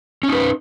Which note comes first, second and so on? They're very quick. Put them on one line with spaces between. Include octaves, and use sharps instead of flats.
C#4 D#4 B4